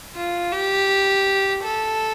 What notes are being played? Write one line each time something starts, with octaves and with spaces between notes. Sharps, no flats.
F4
G4
A4